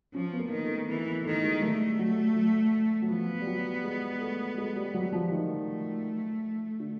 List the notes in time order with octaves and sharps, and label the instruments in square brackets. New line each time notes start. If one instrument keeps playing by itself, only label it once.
[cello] F3 [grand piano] C#4
[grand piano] B3
A#3
[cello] D#3
[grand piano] A3
[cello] E3 [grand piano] B3
[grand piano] B3
[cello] D#3 [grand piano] A3
[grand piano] G#3
[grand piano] G3 [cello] A3
[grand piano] F#3
F#3
F#3
[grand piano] F3 [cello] B3
[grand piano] G3
F#3
G#3
A3
G#3
G3
F#3
F3
[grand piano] D#3 [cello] A3
[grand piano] D3